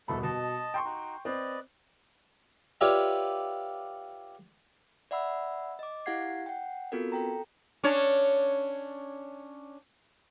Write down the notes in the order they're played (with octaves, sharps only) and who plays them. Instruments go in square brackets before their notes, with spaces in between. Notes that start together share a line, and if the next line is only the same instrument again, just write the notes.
[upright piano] D#1 B2 B5 [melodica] A3 A4
[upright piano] B2 [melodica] D#5 A5
[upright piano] G5 C6 C#6
[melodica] D#4 F#4
[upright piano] C4 [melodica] B4 D5 D#5
[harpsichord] F4 G4 B4 C#5 D5 E5
[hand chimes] D5 E5 F#5 B5 E6
D#5 D6
E4 G4 F5 F#5 G#6 C7
F#5 G5
B3 C4 F4 F#4 A4 A#4
A4 G5 A#5
[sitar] C#4 D4 C#5